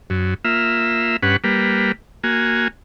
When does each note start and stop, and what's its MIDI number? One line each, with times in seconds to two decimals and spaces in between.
0.10 0.34 42
0.45 1.17 58
0.45 1.17 65
0.45 1.17 76
1.23 1.36 43
1.23 1.36 61
1.23 1.36 71
1.23 1.36 78
1.44 1.92 55
1.44 1.92 58
1.44 1.92 71
2.24 2.68 58
2.24 2.68 66
2.24 2.68 80